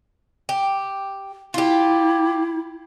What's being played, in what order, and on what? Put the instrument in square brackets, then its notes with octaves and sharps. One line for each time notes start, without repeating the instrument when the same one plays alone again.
[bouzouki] G4
[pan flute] E4 [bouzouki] F4 G4